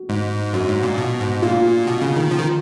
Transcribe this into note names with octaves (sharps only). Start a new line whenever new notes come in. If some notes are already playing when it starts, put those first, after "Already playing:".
Already playing: F#4
G#2
F#2 F#4
G#2
A#2
B2
G#2
A#2 F4
B2
C#3
D#3
F3
D#3